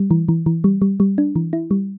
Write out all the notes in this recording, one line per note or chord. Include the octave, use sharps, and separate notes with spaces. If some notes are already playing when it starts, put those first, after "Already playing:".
Already playing: G3
E3
E3
E3
G3
G3
G3
D4
E3
E4
G3